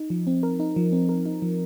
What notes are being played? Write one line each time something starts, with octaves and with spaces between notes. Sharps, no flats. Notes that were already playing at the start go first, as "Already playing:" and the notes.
Already playing: D#4
F3
C4
A#4
D#4
F3
C4
A#4
D#4
F3